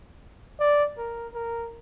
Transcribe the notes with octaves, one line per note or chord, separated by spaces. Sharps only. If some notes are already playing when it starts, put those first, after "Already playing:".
D5
A#4
A#4